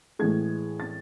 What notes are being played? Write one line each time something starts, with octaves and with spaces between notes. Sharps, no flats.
A2 E3 G#3 G#6
A6